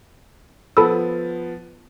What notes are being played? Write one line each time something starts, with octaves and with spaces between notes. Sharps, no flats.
F3 B3 A4 B5 E6